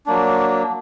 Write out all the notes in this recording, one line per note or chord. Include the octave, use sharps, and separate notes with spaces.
F#3 A#3 D4